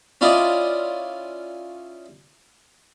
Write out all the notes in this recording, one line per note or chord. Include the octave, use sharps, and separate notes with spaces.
C#4 E4 F4 D5 D#5